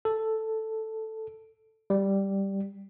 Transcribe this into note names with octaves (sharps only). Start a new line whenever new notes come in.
A4
G3